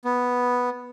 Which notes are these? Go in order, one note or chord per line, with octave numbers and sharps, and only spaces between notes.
B3